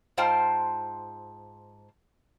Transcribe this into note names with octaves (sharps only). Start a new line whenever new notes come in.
G#2 F4 C5 F5 G5 A5